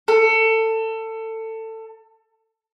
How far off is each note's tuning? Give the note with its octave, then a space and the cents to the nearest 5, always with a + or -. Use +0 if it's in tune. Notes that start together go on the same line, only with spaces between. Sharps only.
A4 +20